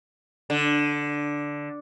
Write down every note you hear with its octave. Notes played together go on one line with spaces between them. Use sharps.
D3